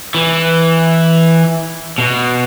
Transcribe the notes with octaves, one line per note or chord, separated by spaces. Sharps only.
E3
B2